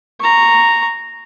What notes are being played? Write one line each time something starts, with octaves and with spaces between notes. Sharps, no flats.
A#5 C#6